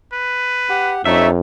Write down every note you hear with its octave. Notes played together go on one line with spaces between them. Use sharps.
B4
G4 F#5
F2 A3 D4 D#4 C#5 E5